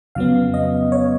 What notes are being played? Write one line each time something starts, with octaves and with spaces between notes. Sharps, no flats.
F2 C#3 F#3 B3 F5
D#5
C#5